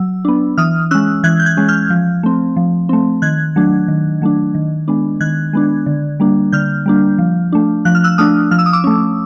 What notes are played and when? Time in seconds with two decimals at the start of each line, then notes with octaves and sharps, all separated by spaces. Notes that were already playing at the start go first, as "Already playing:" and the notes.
Already playing: F#3 E6
0.25 B3 D4
0.58 E3 D#6 F6
0.91 G#3 C#4 E6 F#6
1.24 E3 F#6 G#6
1.39 G6
1.46 F#6 G#6
1.57 G#3 C#4
1.68 F6 G6
1.90 F3
2.23 A3 C4
2.57 F3
2.89 A3 C4
3.22 D#3 F#6 G#6
3.56 F#3 A3 D4
3.88 D#3
4.22 F#3 A3 D4
4.55 D#3
4.88 G#3 B3 D4
5.21 D#3 F#6 G#6
5.53 G#3 B3 D4
5.86 D3
6.20 G3 A#3 D4
6.52 D3 F6 G6
6.86 G3 A#3 D4
7.19 F3
7.53 A3 D4
7.85 F3 F#6
7.95 F6
8.04 E6 F#6
8.18 A3 D4 D#6 F6
8.51 F3 F6
8.59 E6
8.66 D#6
8.73 D6 E6
8.84 A3 C#4